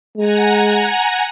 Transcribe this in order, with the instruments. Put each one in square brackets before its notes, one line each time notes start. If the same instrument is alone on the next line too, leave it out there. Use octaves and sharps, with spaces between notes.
[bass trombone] G#3 [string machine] F#5 G#5 A#5